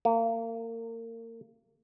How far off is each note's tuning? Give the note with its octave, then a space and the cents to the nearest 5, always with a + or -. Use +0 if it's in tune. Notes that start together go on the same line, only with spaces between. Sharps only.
A#3 -35